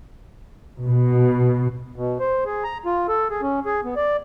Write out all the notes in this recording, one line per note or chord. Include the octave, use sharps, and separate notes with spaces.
B2
B2
C5
G#4
A#5
F4
A4
G#4
C#4
G#4
B3
D5